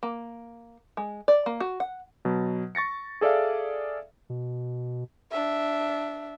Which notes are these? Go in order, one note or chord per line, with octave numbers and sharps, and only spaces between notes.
A#3
G#3
D5
A#3
F#4
F#5
B2 F#3
C#6 A6 A#6 C#7
G#4 A4 D5 E5 F5
B2
D4 E5